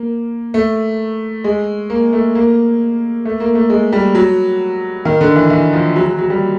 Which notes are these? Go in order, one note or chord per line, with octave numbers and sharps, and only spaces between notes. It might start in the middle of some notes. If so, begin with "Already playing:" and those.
Already playing: A#3
A3
G#3
A#3
A3
A#3
A3
A#3
A3
G#3
G3
F#3
D#3
D3
E3
E3
F3
F#3
F#3
F#3
G3